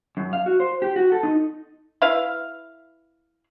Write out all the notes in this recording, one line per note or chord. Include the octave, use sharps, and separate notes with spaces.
F#2
F5
F#4
C5
G4
F#4
A4
D#4
E4 B4 F5